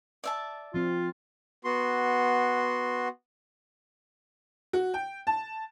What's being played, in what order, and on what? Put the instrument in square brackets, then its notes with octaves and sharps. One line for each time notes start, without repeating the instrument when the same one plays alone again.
[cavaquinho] D5 E5 A5
[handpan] F3 C4 [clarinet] F4
[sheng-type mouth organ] B3 F#4 C6
[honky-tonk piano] F#4
G5
A5